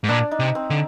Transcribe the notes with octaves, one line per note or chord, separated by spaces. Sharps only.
G#2
A#2 D4
D#4
C3
C4
D3